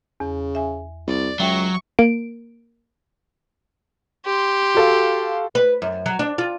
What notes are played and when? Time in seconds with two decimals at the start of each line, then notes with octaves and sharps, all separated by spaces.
0.20 E2 C#3
0.55 E5 G#5
1.07 C2 D5
1.40 C#2 F#3 E5 G5 C#6
1.99 A#3 D7
4.26 G4 C6
4.75 F#4 A4 F5
5.55 B4
5.82 F#2
6.06 F#3
6.19 D4
6.38 F4